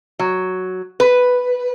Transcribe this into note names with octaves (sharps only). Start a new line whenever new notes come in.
F#3
B4